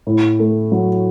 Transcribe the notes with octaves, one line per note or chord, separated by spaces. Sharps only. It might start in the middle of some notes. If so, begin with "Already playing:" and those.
A2
A3
F#3